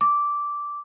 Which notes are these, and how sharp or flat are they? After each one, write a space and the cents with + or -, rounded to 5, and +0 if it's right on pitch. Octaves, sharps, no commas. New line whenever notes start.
D6 -10